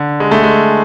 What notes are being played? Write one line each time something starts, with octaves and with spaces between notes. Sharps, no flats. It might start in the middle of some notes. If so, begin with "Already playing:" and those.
Already playing: D3
G#3
A3
G#3